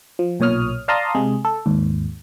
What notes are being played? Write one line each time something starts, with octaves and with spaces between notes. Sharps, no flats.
F3
B1 A#2 C#5 D#6 F6
D5 F5 A5 A#5 C6 D#6
C3 G#3 G#4
A4
D#2 G#2